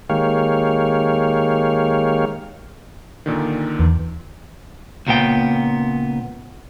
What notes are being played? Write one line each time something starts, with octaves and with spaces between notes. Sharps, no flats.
D#3 G#3 A#3 G4 C#5 F5
A#2 D3 D#3
E2
C#2 A#2 B3 G5